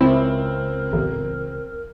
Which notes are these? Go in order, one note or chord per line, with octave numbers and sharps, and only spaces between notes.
C#2 C4 E4 A#4
A1 E2